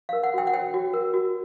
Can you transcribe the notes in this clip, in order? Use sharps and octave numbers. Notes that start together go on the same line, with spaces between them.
A#4 F5
F#5
F#4 G5
F#5
C#5 G5
F#4
A#4
F#4